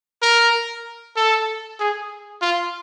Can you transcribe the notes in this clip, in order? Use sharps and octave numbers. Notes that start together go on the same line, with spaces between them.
A#4
A4
G#4
F4